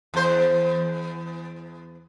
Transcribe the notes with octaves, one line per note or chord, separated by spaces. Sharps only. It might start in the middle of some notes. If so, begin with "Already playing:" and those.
E2 C5